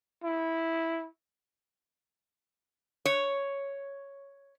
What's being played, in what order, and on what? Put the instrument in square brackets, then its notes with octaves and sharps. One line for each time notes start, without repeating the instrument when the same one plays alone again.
[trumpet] E4
[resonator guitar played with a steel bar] C#5